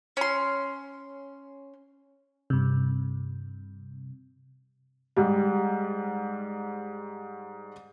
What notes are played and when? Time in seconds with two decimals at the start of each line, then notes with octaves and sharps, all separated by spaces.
0.17 C#4 C6
2.50 G2 C3
5.17 G#2 G3